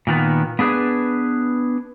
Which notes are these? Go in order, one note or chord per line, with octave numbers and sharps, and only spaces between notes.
A#2 D#3 B3
B3 D4 G#4 B4